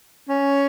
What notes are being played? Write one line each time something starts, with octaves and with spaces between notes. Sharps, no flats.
C#4